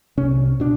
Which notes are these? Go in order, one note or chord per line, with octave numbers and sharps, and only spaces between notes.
C2 C3 C#4
B2 D4